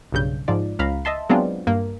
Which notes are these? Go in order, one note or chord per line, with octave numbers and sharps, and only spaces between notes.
B1 G2 C#3 G6
G#2 F3 D5
C#2 F5 A#5 B5
D#5 E5 A5 C6
F#3 G#3 B3 C4 D4 F4
G2 A#3